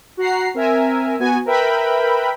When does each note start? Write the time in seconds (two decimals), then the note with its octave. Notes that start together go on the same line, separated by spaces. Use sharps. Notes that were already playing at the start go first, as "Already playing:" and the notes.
0.17 F#4 F#5 A#5 C7
0.54 C4 A#4 E5 G#5
1.20 B3 F#4 G#5
1.46 A#4 B4 E5 G5 B5